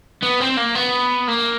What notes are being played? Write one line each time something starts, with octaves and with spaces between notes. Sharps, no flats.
B3
C4
A#3
B3
A#3